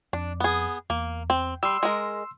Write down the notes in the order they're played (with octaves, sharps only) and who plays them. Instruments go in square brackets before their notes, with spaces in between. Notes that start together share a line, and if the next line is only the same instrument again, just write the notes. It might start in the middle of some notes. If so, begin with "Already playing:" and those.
[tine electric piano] F2 [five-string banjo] D4
[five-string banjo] B3 G#4
[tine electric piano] E2 [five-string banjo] A#3
[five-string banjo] C4
[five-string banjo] G3 [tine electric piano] C6 E6
[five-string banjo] G#3 A#4